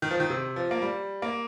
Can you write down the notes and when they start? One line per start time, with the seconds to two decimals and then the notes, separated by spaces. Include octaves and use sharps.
0.02 D#3
0.11 F3
0.20 D#3
0.30 C3
0.56 F3
0.71 A#3
0.82 G3
1.22 A#3